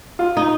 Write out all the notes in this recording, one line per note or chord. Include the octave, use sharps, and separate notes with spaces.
F4
D#4